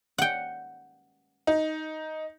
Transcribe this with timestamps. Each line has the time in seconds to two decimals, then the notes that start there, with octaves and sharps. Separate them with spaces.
0.18 F#5 G5
1.47 D#4